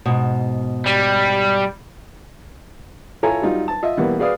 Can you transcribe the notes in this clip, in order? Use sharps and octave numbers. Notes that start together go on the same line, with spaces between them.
G#2 B2
G3
E4 F4 A4 C#5 G#5 A#5
F#3 G3 D#4 F4
A5
F4 D#5 E5
B2 E3 G3 A#3 B3 F#4
F#4 G#4 B4 D5 F5 D#6